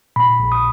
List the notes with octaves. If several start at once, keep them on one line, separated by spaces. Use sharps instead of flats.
A#2 B5
A#1
D#6